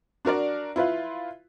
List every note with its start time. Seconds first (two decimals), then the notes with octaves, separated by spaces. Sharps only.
0.25 D4 F#4 A#4 D5
0.76 E4 F4 B4 F5